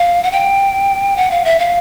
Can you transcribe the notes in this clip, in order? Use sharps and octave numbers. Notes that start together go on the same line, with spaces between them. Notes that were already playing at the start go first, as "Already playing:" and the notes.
Already playing: F5
F#5
G5
F#5
F5
E5
F5